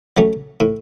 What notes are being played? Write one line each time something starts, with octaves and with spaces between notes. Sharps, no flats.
F#3 A3 C#4
A2